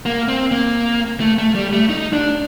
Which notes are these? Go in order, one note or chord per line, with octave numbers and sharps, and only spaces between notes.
A#3
C4
A#3
A3
A3
G3
A3
D#4
D4